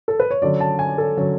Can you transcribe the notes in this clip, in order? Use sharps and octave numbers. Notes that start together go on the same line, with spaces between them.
A4
B4
C#5
D3 F#3 C#4 D5
A5
G#5
A4
D3 F#3 C#4